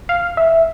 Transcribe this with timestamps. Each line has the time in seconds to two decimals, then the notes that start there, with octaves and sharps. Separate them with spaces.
0.09 F5
0.37 E5